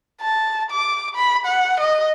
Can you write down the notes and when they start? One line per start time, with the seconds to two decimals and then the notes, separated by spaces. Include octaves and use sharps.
0.21 A5
0.71 D6
1.16 B5
1.46 F#5
1.80 D#5